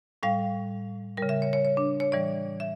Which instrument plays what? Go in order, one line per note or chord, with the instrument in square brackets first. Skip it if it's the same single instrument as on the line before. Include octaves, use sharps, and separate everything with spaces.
[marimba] A2 G3 F5
C#3 G3 A#4
E5
C#5
C#5
C#5
D4
C#5
A2 E3 G3 D5
E5